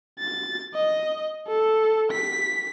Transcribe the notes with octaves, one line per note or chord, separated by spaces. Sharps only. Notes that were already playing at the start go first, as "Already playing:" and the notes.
A6
D#5
A4
B6